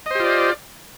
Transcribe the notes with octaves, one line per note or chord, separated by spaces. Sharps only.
F4 G4 C5 D5 D#5